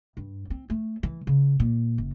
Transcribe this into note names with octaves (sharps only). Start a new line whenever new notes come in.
G2
C4
A3
E3
C#3
A#2
F#1